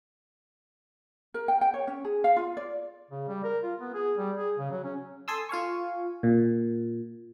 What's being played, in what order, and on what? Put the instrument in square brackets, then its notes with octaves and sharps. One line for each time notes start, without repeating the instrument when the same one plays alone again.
[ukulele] A#4
G5
G5
C#5
C#4
G#4
F5
F4
D5
[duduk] C#3
G3
A#4
F4
B3
G#4
G3
G#4
C#3
F#3
C#4
[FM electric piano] A4 G#5 A5 C6 D#6 E6
F4 F5 G#5 C#6
A#2